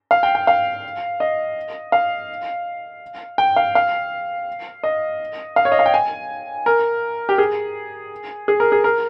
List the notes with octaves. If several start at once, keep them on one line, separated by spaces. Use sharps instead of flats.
F5
G5
G5
F5
D#5
F5
G5
F5
F5
D#5
F5
C#5
D#5
F5
G5
G#5
A#4
G4
G#4
G#4
A#4
G#4
A#4